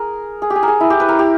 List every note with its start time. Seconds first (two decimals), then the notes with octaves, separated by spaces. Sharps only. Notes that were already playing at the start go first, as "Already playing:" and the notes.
Already playing: G#4 A#4
0.42 G#4
0.50 G4
0.56 G#4
0.63 A#4
0.68 G#4
0.80 E4
0.90 G4
1.00 B4
1.09 A#4
1.19 G4